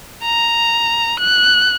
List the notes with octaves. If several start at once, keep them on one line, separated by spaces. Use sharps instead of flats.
A#5
F#6